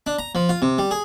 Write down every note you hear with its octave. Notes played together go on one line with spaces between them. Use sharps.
D4
A#5
F3
F4
C3
G3
G#4